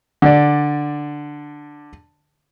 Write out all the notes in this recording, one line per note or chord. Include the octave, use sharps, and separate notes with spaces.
D3 D5